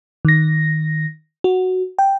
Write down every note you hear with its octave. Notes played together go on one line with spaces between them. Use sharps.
D#3 A#6
F#4
G5